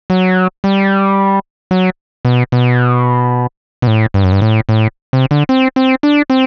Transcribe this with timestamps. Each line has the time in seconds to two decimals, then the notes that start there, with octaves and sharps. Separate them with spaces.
0.10 F#3
0.64 G3
1.71 F#3
2.25 B2
2.52 B2
3.82 B2
3.87 A2
4.14 G2
4.24 F#2
4.32 G2
4.42 A2
4.69 A2
5.13 C3
5.31 D3
5.49 C4
5.76 C4
6.03 D4
6.30 C4